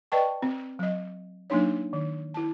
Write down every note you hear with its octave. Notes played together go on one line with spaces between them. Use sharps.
B4 D5 D#5 G5 A5 C#6
C4
F#3 D#5
F#3 A#3 D4 D#4 C#5
D#3
E4 A5